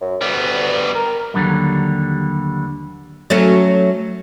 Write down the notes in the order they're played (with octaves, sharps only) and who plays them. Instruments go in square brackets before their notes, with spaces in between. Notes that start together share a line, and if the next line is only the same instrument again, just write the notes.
[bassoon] F#2
[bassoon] D2 [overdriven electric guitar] G3 B3
[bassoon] A#4
[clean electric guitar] D#2 A#2 D3 F#3 G3
[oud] F#3 A3 C#4